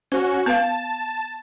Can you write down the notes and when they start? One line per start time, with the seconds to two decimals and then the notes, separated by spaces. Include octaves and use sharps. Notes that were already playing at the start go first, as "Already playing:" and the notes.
0.12 C#4 F#4 C5
0.46 B3 B4 F5 A5